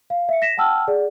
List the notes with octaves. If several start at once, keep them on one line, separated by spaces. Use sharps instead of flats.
F5
E5 C#7
A#6 B6 E7
F#5 G5 A5 E6 F6
G#4 D5 F#5